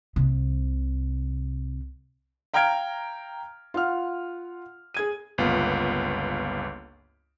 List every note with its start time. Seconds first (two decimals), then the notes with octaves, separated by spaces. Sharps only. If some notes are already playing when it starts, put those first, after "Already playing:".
0.16 C2 C3
2.54 F5 G5 A#5 F6 G#6 D7
3.74 F4 F#5 F6
4.94 G#4 G#6 D#7
5.38 G1 C#2 A#3 B3 F4